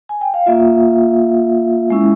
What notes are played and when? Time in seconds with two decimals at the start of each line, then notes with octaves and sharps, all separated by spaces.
0.09 G#5
0.21 G5
0.34 F5
0.46 A#3 F4 E5
1.90 G#3 C#4 E4